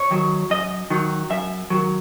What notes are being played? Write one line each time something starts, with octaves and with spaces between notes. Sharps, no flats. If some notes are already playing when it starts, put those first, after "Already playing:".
Already playing: C#5
D#3 F#3
F#2 D#5
D#3 F#3
F#2 E5
D#3 F#3